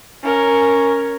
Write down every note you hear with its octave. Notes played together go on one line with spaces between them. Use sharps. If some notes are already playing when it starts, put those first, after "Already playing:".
C#4 A#4